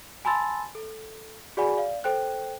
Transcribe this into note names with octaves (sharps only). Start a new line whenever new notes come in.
G#5 A5 B5 C6 E6 A6
A4
F#4 G#4 D5 F#5 G#5 B5
D5 F5
A4 C5 G5 F#6